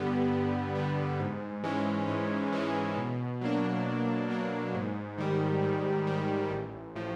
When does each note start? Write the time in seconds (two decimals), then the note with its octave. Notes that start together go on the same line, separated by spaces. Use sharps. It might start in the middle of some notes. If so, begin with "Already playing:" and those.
Already playing: G2 D3 G3 B3
0.31 G2
0.75 D3 G3 B3
1.20 G#2
1.64 E3 G#3 C#4
2.08 G#2
2.53 E3 G#3 C#4
2.97 B2
3.41 F#3 A#3 D4
3.86 B2
4.30 F#3 A#3 D4
4.74 G#2
5.18 D#3 G3
5.63 G#2
6.07 D#3 G3
6.50 A1
6.95 A2 F3